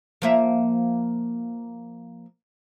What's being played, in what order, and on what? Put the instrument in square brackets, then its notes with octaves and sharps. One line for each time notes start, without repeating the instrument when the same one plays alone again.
[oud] F3 A#3 E5